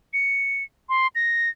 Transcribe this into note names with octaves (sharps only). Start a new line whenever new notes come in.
C#7
C6
A#6